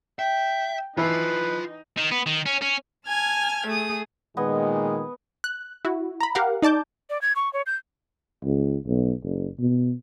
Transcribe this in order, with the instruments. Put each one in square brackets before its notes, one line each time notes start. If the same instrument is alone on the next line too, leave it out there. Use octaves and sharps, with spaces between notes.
[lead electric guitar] E5 [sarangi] G5
[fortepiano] E3 [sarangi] D#4 [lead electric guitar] F4 A5 [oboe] B4
[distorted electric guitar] D#3
B3
D#3
C#4
C#4
[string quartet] G#5 A5 F6 G#6
A3 G#4 D#6
[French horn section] A#2 D#3 G#3 [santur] B3 D#5 G#5
[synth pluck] F#6
E4 F#4
A#5 B5
G4 A#4 F5 F#5
D#4 D5 A5 D6 G6
[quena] D5
G#6
C#6
C#5
G6
[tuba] C#2
B1
F#1
B2